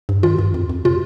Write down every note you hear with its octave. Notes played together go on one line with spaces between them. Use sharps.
G2
D#3 F4
G2
F2
F2
C3 F4